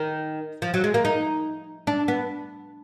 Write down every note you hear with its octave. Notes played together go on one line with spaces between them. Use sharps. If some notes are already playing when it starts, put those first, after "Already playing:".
Already playing: D#3
F3
F#3
G#3
A#3
D#4
D4
B3